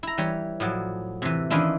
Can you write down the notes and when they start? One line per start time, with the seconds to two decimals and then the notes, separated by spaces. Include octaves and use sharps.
0.03 E4 A#5
0.18 E3 G3 C#5
0.60 A2 F3 F#3
1.22 C3 E3
1.50 D#3 E3 C#4 D4 E4 F4